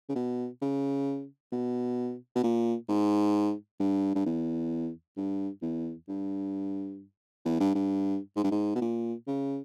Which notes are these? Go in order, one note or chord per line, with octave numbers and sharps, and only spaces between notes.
C#3
B2
C#3
B2
B2
A#2
G#2
G2
G2
E2
G2
E2
G2
E2
G2
G2
G#2
G2
G#2
B2
A#2
C#3